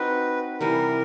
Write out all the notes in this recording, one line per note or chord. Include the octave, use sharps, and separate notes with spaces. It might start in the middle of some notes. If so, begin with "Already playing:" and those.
Already playing: C4 D#4 F#4 B4
C3 E3 G3 A#4